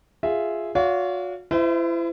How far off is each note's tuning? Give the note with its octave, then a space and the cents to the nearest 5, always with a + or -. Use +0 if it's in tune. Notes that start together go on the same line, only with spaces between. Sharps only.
F4 +0 G#4 +0 E5 +0
F#4 -40 C#5 +45 F5 -25
E4 +35 C5 -40 E5 -30